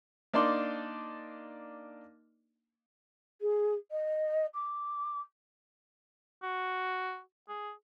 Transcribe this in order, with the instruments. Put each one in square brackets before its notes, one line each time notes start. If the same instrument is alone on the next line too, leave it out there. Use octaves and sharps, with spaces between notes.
[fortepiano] A#3 D4 D#4 D5 C6
[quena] G#4
D#5
D6
[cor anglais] F#4
G#4